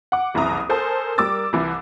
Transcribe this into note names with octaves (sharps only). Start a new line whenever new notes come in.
F#5 D6
F#1 C2 E3 E4 A#5 D#6
A4 A#4 C5 G#5 A5
G3 A#4 D6 E6 A6
C2 E3